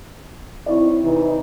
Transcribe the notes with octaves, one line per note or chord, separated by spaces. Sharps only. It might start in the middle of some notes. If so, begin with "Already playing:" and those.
C4 D#4 E4 C#5 D5
C3 E3 D#4